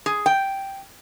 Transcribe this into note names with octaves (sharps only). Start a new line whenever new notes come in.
G#4
G5